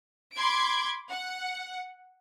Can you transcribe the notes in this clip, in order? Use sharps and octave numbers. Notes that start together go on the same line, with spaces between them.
B5 C6 D6 G#6 D7
F#5